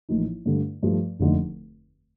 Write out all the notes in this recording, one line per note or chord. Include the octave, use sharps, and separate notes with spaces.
A1 A2 F3 A#3 D#4
G2 D3 A3
G2 F3 A3
F1 D#2 D3 A3 D#4